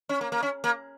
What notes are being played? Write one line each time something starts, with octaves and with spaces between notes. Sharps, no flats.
C#4
A#3
A#3
C#4
A#3